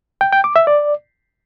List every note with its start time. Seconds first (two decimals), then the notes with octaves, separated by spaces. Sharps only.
0.21 G5
0.32 G5
0.44 D6
0.56 E5
0.67 D5